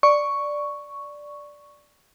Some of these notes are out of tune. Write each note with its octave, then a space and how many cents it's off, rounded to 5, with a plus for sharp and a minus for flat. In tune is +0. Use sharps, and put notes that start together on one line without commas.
D5 +0 C#6 +0